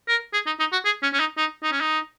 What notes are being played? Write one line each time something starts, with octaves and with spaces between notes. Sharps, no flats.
A#4
G#4
D#4
D#4
F#4
G#4
C#4
C#4
D#4
D#4
D#4
C#4
D#4